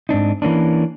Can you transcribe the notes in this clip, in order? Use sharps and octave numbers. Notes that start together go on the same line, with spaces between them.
G#2 C4 D4 D#4
E3 A#3 C#4 D4